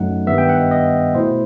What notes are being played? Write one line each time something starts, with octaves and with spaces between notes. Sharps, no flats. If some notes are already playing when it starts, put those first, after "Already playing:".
Already playing: F#2 F#3 A3 D#4 F#5
G2 D#3 G3 B3 E5
G5
F#5
D#5
D#5
B2 A3 E4 C5